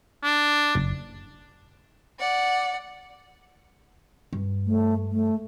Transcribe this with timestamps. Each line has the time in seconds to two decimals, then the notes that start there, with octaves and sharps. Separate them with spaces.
0.23 D4
0.75 F#1
2.20 D5 F#5
4.33 G2
4.66 A3
5.11 A3